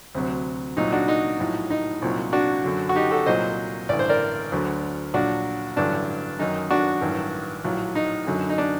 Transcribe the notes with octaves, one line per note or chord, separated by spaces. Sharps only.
D2 C3 F#3
C2 A#2 F#3 D#4
D4 F#4
D#4
A#1 A2 F#3
D#4
C2 A#2 F#3
D4 F#4
F#2 D3 F#3
F#4
D#4 G4
F#4 A4
C2 A#2 F#3 C5 D#5
A1 G2 D3 D5
C5
A#4 D5
D2 D3 F#3
A#1 A#2 F#3 D4 F#4
A1 G2 D3 F#3 D4
F#2 D#3 F#3 D#4
D4 F#4
A1 G2 D#3 F#3
A#1 A2 F#3
D#4
F#2 D3 F#3
D#4
D4